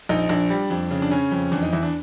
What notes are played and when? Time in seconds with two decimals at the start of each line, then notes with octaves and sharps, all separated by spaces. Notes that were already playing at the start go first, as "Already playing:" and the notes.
0.09 A#1 D#4
0.29 A#1 D4
0.50 G3
0.70 F2
0.91 C#3
1.02 D4
1.11 C#3 C#4
1.32 F2
1.52 E2 D4
1.62 D#4
1.72 E2 E4
1.83 D4